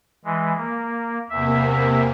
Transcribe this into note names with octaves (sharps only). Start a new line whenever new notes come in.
E3 G#3
A#3
E2 C3 A#3 E5